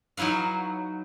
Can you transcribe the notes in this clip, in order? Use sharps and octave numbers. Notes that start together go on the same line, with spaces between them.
F#3 D#4 E4 B4 F5